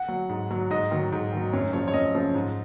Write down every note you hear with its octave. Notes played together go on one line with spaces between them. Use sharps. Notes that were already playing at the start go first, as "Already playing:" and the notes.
Already playing: F#5
F#3
G#2
F#3
G#2 D#5
D#3 F#3
G#2
D#3 F#3
F#2 C#5
C#3 F3 C#5
C#5
F#2 D#5
C#3 F3
G#2